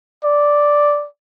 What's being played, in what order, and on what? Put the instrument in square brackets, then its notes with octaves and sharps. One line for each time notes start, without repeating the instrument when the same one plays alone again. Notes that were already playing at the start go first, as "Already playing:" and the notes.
[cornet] D5